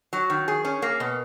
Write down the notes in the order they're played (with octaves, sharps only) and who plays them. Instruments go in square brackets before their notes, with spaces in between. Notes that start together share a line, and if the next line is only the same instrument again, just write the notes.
[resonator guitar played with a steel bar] F#3
D#3
G#4
C#4
A#3
B2